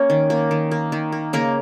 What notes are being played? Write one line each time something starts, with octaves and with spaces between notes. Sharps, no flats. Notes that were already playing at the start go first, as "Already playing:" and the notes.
Already playing: A#3 C#4 C#5
D#3
A#3
D#3
A#3
D#3
A#3
C#3 A#3 A#4